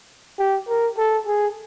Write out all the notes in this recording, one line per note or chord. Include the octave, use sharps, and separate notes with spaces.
G4
A#4
A4
G#4